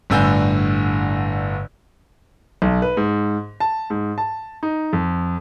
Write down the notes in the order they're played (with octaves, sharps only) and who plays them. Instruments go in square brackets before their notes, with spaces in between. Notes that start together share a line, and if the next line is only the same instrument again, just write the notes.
[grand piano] G1 A2 D3 G#5 E6 G6
B1
B4
G#2
A5
G#2
A5
D#4
F2